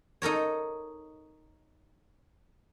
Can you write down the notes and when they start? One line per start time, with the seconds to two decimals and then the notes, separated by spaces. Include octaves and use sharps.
0.22 D#4 A4 A#4 C#5